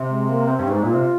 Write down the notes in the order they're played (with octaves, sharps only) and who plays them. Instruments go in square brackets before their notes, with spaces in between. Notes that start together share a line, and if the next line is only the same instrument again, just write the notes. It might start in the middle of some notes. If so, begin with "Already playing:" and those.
Already playing: [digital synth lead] C3
[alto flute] G#3
A#3
C4
[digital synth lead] G2
[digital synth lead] G#2 [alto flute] D#4
[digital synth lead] A#2 [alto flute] F4
[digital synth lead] C3